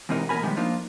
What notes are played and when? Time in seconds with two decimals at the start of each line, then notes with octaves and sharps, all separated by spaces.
0.09 E2 G#2 C3 E3 D#4 A#4
0.29 E2 A#2 F3 A#4 G#5 B5
0.43 D#3 F3 G3 G#3 B3
0.57 F3 A#3 D4 D#4 F4